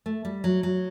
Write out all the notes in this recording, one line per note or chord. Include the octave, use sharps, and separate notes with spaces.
A3
G3
F#3
F#3